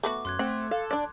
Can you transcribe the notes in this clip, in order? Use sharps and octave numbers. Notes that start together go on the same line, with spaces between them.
A3 B3 F#4 D6
F#2 C6 F#6 G#6
A3 C4 F#5
A4 F5
D4 D5